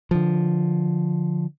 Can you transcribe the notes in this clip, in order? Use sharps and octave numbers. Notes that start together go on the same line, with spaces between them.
D3 F3